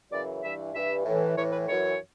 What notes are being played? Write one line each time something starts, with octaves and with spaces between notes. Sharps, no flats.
F#2 C#3 E3 D5
G2 E3 E5
G2 E3 E5
A2 E3
A2 E3 C#5
B4
F#2 E3 C#5